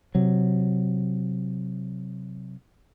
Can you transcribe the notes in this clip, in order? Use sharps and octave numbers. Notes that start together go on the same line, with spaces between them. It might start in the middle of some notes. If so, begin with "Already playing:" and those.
C3 F#3